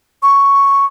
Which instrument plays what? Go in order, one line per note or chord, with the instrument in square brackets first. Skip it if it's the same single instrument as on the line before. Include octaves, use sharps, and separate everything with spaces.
[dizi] C#6